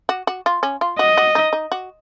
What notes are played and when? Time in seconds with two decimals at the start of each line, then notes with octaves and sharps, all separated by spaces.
0.09 F#4
0.27 F#4
0.46 F4
0.63 C#4
0.81 F4
0.99 F#4 D#5
1.17 F#4
1.35 D#4
1.53 D#4
1.72 F#4